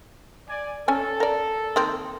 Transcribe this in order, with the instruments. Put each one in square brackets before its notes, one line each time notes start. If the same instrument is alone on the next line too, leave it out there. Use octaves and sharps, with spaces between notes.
[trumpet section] D5 G#5
[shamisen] C#4 G#5 [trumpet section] A4
[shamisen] A#4 D5
D#3 A#3 C4